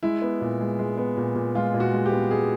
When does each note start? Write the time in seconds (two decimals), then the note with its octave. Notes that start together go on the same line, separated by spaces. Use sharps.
0.03 G#3 E4
0.22 B3
0.41 A#2
0.60 G#3
0.79 G#3
0.98 B3
1.17 A#2
1.35 A#2
1.55 G#3 F4
1.74 A#2
1.80 F#4
1.93 G#3
2.06 G4
2.12 B3
2.31 G#3 G#4